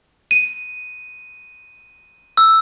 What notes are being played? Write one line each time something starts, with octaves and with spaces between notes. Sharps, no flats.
D#7
E6